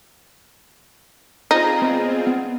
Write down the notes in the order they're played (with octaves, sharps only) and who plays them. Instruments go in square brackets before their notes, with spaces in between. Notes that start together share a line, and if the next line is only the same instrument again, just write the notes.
[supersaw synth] C4 F4 G#4 [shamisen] D#4
[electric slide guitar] B3 D5 D#5
B3